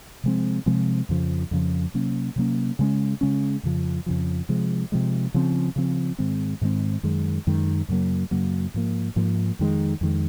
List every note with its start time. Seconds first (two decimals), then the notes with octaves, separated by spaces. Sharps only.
0.24 C3 F3 G#3 C4
0.66 C3 F3 G#3 C4
1.09 F2 C#3 F3
1.51 F2 C#3 F3
1.94 C3 F#3 A#3 C#4
2.36 C3 F#3 A#3 C#4
2.79 C#3 G#3 C#4
3.21 C#3 G#3 C#4
3.63 F2 C#3 F3
4.06 F2 C#3 F3
4.49 C3 F3 G#3
4.92 C3 F3 G#3
5.34 C#3 F3 C4
5.76 C#3 F3 C4
6.19 G#2 D#3 G#3 C4
6.61 G#2 D#3 G#3 C4
7.03 F#2 D#3 G#3
7.47 F#2 D#3 G#3
7.89 F#2 C#3 F#3 A#3
8.31 F#2 C#3 F#3 A#3
8.74 G#2 F3 A#3
9.16 G#2 F3 A#3
9.59 F2 D#3 G#3
10.01 F2 D#3 G#3